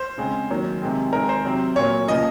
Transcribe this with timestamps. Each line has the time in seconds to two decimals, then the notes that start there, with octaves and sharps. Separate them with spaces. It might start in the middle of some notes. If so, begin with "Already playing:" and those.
Already playing: C5
0.18 C#3 G#3 C4
0.50 D#3 F#3 A#3
0.82 C3 D#3 G#3 C4
1.12 D#3 G#3 C4 A#4
1.29 C5
1.45 C3 F#3 C4
1.76 A#2 F#3 A#3 C#5
2.08 C#3 F3 A#3 D#5